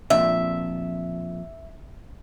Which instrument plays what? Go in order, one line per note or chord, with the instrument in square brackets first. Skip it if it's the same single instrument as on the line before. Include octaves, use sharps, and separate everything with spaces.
[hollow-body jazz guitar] F2 A#2 D4 [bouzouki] E5